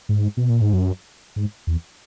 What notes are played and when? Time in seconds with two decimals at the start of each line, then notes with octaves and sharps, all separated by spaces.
0.09 G#2
0.37 B2
0.49 A#2
0.61 G#2
0.73 F#2
1.36 G#2
1.67 E2